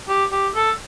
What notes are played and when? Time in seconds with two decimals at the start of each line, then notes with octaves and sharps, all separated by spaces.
0.08 G4
0.32 G4
0.55 A4